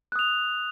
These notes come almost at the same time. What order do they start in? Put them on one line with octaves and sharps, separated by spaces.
F#6 D#6 F7